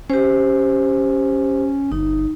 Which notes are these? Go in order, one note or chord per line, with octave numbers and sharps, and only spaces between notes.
C#4 G4 C5
G1 D#4